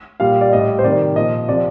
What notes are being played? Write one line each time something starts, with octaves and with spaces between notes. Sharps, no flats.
A#2 G3 F5
D5
A2 G3 D#5
C5
C3 D#3 G3 D5
A#2 F3 D#5
C3 F3 D5